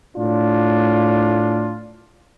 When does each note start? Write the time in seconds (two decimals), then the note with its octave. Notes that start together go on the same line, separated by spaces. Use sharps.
0.17 A2 D4 F4